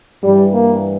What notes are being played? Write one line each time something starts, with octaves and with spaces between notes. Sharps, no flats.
G2 E3 G3
A#3